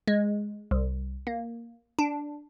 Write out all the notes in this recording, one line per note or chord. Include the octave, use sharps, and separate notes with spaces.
G#3
C2
A#3
D4